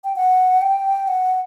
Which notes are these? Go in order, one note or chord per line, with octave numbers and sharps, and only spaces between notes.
G5
F#5
G5
F#5